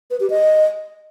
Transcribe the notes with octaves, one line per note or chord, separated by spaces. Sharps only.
B4
G4
D#5